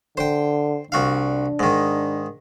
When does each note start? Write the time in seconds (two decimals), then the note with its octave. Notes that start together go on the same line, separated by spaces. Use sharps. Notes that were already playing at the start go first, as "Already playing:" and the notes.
0.17 D3 C5 G5
0.92 C2 D4 F#4 F5
1.59 G#2 D#3